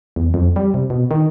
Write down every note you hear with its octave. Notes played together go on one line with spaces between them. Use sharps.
E2
F2
G3
C3
B2
D#3